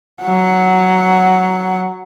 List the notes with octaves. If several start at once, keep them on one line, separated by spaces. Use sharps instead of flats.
F#3 F#5